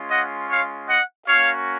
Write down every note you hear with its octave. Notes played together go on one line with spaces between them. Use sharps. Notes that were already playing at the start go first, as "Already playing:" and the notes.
Already playing: G#3 C#4 F4
D#5 F#5
C#5 F5
D#5 F#5
A#3 C#4 F#4 C#5 F5